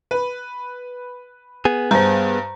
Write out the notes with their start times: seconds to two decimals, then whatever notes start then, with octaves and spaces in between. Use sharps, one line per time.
0.11 B4
1.65 B3 G#4
1.91 G2 C5 A#5